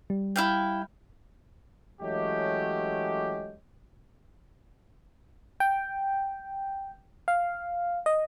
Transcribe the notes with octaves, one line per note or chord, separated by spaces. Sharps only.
G3
E4 F5 G5
E3 F#3 G#3 A3 C#4 G4
G5
F5
D#5